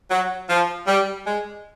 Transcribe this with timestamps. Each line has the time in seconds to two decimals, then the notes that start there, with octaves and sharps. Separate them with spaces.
0.11 F#3
0.50 F3
0.88 G3
1.27 G#3